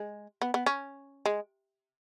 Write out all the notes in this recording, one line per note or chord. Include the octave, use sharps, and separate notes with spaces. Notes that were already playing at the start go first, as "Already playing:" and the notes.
Already playing: G#3
B3
B3
C#4
G#3